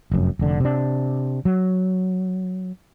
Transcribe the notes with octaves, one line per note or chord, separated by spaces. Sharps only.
F1 F#2
F1 D3
C3 D4
F#3